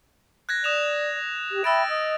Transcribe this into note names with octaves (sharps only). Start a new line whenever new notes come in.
F#6 G#6 A#6
D5 D#6 E7 F7
G4
E5 G5 B5 E6 A6 D7
D#5 D#6